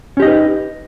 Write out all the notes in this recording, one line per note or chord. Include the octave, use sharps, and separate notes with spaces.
C#4 D#4 G4 B4 D#5